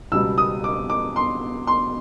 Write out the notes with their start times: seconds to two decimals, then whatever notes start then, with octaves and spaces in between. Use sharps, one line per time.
0.12 C#2 B2 G3 B3 E6
0.38 D#6
0.64 D6
0.90 D6
1.16 C6
1.67 C6